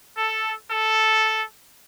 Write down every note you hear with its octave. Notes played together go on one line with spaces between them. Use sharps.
A4
A4